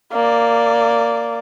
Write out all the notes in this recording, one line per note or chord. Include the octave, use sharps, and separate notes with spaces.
A#3 D5